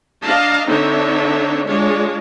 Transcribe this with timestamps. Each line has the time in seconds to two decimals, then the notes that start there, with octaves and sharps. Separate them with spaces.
0.22 D4 D#5 F5 A5 A#5
0.67 D3 C4 D4 D#4 C#5 E5
1.67 G#3 D4 F4 C#5